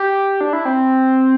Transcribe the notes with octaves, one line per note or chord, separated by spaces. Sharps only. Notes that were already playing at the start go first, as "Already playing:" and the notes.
Already playing: G4
D4
E4
C4